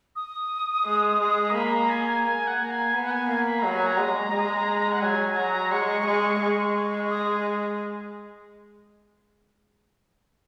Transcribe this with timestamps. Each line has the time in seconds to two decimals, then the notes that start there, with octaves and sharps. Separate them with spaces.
0.16 D#6
0.86 G#3
1.20 G#3
1.50 A#5
1.55 A#3 B5
1.72 A#5
1.89 G#5
2.07 G#5
2.24 G#5
2.47 F#5
2.59 A#3
2.64 A#5
2.71 G#5
2.94 B3
3.04 F#5
3.11 G#5
3.28 A#3 G#5
3.46 B5
3.59 F#3 A#5
3.72 G#5
3.86 A#5
3.97 G#3
4.32 G#3
4.92 F#5
5.02 F#3 G#5
5.37 F#3 A#5
5.72 G#3 C#6
6.06 G#3
6.41 G#3
7.10 D#6